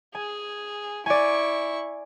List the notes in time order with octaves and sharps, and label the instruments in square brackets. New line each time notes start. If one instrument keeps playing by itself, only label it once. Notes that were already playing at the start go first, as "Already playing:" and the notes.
[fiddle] G#4 [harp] G#5
[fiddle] E4 C#6 [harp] D5 G#5